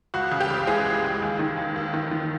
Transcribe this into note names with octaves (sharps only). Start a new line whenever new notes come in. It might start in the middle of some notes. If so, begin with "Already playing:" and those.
C#2 F#4
C#3
G4
C#2
E3 G#3 G#4
C#2
C#2
D#2
D#3
D#2
D#2
D#3
D#3